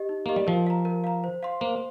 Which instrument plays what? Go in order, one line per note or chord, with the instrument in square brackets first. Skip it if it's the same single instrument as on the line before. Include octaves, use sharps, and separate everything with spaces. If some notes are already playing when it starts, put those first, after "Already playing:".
Already playing: [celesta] G4 D#5
D#4
[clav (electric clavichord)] A#3 [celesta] G4 D#5
[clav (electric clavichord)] G3
[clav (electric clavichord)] F3 [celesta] A#4
[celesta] F5 A#5
A#4
F5 A#5
C5
F5 C6
[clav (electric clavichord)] A#3 [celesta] C5